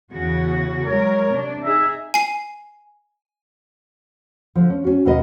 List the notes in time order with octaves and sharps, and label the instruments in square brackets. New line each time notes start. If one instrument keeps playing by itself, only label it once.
[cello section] E2 C#3 F#4
[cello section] F#3 G#3 A#4 [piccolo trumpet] C#5
[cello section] C3 D4
[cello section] D#4 G#4 [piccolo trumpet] E5
[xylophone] G#5 C7
[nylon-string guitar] D3 F3
C#4
C#4 F#4
D#2 B2 A#3 B4 D#5